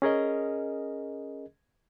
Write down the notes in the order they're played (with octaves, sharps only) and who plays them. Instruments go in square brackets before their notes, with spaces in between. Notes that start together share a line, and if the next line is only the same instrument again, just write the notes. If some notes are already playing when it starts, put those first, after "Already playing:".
[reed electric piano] C#4 G#4 A#4 D#5